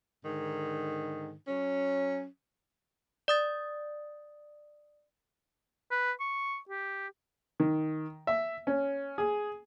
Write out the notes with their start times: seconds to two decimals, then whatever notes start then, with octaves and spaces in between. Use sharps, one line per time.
0.25 G#2 D3 D#3
1.48 F#3 C#4
3.28 D5 D#6 A6
5.91 B4
6.20 C#6
6.69 G4
7.60 D#3
8.27 E5
8.67 C#4
9.18 G#4